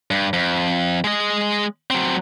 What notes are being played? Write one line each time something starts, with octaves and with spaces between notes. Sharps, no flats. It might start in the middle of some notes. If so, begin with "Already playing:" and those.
G2
F2
G#3 D#5
F#3 C4